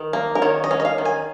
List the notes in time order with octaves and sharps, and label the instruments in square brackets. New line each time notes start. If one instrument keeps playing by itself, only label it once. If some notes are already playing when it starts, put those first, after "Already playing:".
Already playing: [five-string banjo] D#3
A#3
A#4
D#3 C#5
D#5
C#4
D#5
F5
D#3
G#5